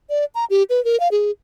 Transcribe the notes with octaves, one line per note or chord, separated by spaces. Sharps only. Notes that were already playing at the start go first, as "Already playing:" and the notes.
D5
A#5
G4
B4
A#4
F5
G#4